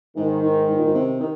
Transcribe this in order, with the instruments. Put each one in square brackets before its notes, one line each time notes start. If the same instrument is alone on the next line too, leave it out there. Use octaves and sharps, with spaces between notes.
[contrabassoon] G#2 [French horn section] D#3
[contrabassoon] G#2
G#2
A#2
G#2
C3
D#3